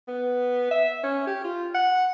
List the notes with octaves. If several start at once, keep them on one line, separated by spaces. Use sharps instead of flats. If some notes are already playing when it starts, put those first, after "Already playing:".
B3
E5
C#4
G4
F4
F#5